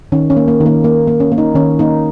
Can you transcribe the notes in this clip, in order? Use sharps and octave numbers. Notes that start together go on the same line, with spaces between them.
D#3 C#4
C#4
A#3
A#3
D#3
A#3
A#3
A#3
C#4
A#3
D#4
D#3 C#4
A#3 D#4